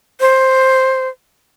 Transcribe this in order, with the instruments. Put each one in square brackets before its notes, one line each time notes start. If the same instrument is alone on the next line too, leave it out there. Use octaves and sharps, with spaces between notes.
[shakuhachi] C5